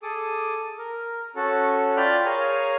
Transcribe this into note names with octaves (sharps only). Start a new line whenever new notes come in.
G#4 A4 D6 D#6
A#4
C#4 F#4 A4
F4 D5 G5 B5 D6 F6
G#4 A#4 C#5 F5 G#5 A#5